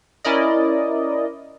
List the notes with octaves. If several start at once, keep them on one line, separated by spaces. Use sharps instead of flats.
C#4 E4 A#4 D5 D#5